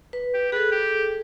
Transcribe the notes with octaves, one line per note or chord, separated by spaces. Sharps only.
B4
G4
G#4 A4 B4
G4